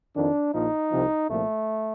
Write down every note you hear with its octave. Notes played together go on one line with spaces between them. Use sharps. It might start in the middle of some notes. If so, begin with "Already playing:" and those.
F2 D#3 D4
A#1 A#2 F3 D#4
C2 C3 F3
C2 A#2 F3 A3